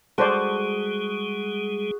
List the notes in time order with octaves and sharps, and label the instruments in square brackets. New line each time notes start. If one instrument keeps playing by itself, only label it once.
[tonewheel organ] G3 G#3 [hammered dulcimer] F#4 [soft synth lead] G#4 [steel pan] A4 C5 D5